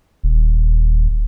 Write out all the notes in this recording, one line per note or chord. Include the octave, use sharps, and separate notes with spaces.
D#1